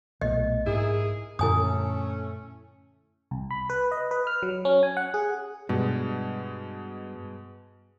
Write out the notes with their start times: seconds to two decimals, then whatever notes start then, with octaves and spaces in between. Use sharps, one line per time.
0.21 B1 A#2 A3 D#5
0.66 G#2 A#3 E4 G#4
1.39 F#2 A#2 D3 A3 C#4 E4 G#5 D#6
3.31 C2
3.51 B5
3.70 B4
3.92 D#5
4.11 B4
4.27 F6
4.43 F#3
4.65 C#4
4.83 G#5
4.97 F#5
5.14 G#4
5.69 G2 B2 G#3